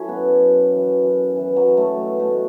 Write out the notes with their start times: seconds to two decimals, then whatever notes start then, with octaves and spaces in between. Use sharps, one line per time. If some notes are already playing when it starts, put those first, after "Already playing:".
Already playing: F#3 C#4 E4 A4
0.09 F#2 B3
0.40 F#2
0.72 E3
1.04 F#2
1.36 E3
1.56 F#3
1.67 E3
1.77 A3
1.98 B2
2.20 A3
2.30 B2